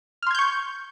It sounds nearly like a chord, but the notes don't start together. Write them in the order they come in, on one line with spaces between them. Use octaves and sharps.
F6 C6 G#6 G6 C#6